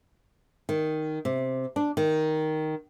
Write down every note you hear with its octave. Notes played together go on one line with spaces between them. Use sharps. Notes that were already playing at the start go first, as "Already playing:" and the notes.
D#3
C3
D4
D#3